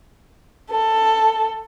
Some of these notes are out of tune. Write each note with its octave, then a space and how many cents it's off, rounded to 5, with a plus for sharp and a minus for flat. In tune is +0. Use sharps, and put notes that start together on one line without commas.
A4 +10